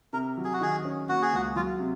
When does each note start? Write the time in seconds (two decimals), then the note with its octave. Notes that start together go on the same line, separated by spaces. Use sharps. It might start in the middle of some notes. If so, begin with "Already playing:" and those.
0.13 C3 A#4
0.37 F#3
0.44 G#4
0.53 F#4
0.61 D#3 G#4
0.85 C#4
1.09 A#3 F#4
1.22 G#4
1.33 C#2 F#4
1.56 F#3 F4
1.80 C3